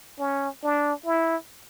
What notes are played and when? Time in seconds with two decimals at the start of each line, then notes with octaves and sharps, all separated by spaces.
0.19 C#4
0.63 D4
1.06 E4